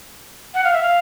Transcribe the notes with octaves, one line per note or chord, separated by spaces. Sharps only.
F#5
F5
E5
F5